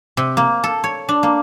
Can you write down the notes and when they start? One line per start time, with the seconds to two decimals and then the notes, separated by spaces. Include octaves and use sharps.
0.17 C3
0.37 A#3
0.64 A4
0.84 C#5
1.09 D4
1.23 A#3